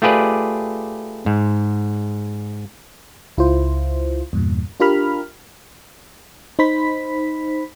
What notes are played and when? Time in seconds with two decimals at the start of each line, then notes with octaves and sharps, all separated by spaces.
0.02 A3 F4 G4 G#4 B4 D5
1.26 G#2
3.37 C#2 E4 F4 C5
4.33 E2 G2 A#2
4.80 D4 F4 G4 A#4 B5 F6
6.59 D#4 C5 B5 B6